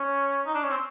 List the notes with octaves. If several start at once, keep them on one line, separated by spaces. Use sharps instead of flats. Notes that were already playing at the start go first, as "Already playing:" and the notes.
Already playing: C#4
D#4
D4
C#4
C4